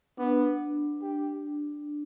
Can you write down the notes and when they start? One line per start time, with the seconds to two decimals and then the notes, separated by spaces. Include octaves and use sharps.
0.18 B3 D4
1.02 G4